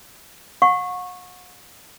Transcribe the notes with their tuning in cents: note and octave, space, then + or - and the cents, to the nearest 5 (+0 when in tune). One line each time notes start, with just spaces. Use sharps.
F#5 -40 C#6 -15